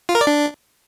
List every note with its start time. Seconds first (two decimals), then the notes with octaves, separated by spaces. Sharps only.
0.09 F4
0.15 A#4
0.21 D5
0.27 D4